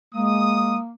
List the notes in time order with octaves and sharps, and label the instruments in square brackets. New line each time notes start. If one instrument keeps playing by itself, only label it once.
[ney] G#3 [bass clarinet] A#3 [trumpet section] D#6